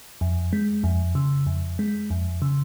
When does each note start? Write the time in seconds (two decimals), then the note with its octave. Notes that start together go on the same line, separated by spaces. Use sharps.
0.21 F2
0.53 G#3
0.84 F2
1.15 C#3
1.46 F2
1.79 G#3
2.10 F2
2.42 C#3